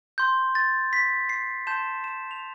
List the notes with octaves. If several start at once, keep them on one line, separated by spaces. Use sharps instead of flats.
C6 G6
A6
B6
C7
A5 C6 G6 E7
E7
F7